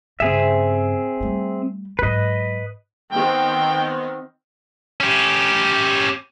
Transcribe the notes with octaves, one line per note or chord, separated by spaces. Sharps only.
G2 C#3 C4 G#4 E5
G3 A3
G#2 F#3 B4 D#5
D#3 B3 C4 G5
C#4 G4